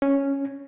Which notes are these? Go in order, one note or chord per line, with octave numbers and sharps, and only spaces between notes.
C#4